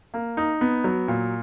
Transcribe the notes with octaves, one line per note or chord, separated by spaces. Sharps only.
A#3
D#4
B3
F#3
A#2